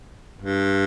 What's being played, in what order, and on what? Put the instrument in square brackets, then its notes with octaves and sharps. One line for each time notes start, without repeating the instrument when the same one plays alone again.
[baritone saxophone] G2